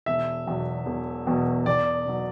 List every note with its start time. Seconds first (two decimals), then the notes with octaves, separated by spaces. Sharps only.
0.06 E1 E5
0.47 E2 B2 F#3
0.86 E1
1.27 E2 B2 F#3
1.66 E2 D5
2.06 B2 F#3